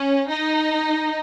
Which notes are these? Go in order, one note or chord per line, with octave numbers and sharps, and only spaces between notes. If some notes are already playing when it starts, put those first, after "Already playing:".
Already playing: C#4
D#4